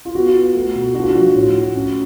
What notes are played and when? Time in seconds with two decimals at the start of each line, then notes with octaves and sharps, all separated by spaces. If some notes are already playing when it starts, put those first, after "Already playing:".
0.05 F4
0.15 B3 F#4
0.35 F4
0.55 A3
0.75 B2
0.94 D4 F#4
1.02 F4
1.09 F#4
1.15 F3
1.35 A2
1.54 F4
1.74 C#4